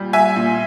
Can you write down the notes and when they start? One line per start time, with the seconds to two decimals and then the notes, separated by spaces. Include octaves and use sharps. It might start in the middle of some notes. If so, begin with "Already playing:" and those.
Already playing: A#2 G3
0.13 E5 G#5
0.36 A#2